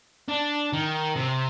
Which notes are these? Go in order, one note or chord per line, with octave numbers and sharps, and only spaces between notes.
D4
D#3
C3